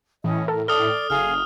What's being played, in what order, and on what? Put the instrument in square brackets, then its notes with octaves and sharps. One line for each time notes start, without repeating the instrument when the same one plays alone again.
[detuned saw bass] A2 [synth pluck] E3 [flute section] C#4 D#5
[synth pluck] A4 [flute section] A#4
[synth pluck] A4 [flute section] D5 [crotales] D#6 F6 G7
[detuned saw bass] F#1 [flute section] G#4 F5 [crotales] F6